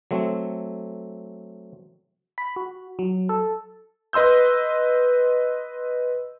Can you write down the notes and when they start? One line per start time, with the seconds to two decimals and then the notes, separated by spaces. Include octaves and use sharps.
0.11 F#3 A3 C4
2.38 B5
2.56 F#4
2.99 F#3
3.29 A4
4.13 B4 D#5 C6 E6 G6